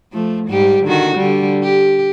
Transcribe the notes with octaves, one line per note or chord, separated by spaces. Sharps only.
F3 A3
G#2 G3 G4
D3 D#3 F#4
D3 G3
G4